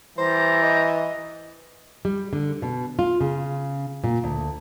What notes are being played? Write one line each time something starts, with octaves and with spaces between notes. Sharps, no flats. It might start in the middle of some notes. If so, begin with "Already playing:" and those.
E3 G3 C5 A#5
D#5
G3
D3
B2
F4
C#3
A#2
D2